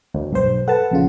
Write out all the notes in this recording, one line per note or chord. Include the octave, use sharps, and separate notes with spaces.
D2
B1 G2 C5
A4 B4 F#5 A5
A#1 C#3 F4